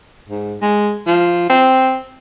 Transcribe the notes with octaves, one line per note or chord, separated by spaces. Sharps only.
G#2
G#3
F3
C4